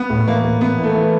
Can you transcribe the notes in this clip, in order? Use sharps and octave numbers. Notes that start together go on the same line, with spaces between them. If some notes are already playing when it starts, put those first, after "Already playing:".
Already playing: B3
A2
E3 A#3
A2
E3 B3
E3
A3
E3